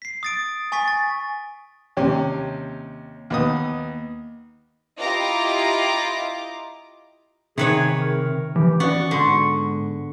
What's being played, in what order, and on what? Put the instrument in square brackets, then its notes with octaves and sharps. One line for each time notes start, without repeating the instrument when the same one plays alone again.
[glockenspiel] B6 C7
D#6 A6 D7
G#5 C#6 A6 B6
A6
[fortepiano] D#2 C3 C#4
D#2 B3 D#6
[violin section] E4 F4 G4 D#5 A#5 D6
[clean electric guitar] C3 [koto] D#3 B4 C#5 [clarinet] G#4
[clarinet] A#4
[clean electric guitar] E3 [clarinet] G4
[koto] B3 [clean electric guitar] C#4 F#4 D5 [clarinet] C#6
[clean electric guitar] G#2 C6 [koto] D3